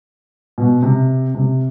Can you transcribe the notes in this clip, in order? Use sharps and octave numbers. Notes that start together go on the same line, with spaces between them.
B2
C3
C3